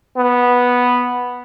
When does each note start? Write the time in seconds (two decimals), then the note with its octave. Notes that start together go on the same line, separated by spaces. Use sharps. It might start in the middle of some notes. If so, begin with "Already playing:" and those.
0.17 B3